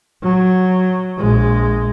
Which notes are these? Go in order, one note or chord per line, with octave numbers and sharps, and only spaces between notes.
F#3
A#1 G#3